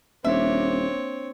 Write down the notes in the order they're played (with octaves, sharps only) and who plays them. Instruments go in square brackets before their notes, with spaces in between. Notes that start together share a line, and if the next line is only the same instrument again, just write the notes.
[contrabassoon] D#1 [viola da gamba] A#3 D4 [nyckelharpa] C4 C#5 [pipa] E5